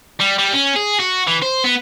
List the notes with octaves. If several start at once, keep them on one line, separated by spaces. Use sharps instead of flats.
G3
G3
C#4
G#4
F#4
E3
C5
B3